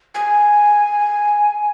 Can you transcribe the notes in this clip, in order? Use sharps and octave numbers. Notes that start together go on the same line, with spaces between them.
G#5